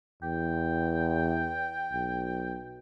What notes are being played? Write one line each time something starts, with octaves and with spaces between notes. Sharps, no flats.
E2 G5
B1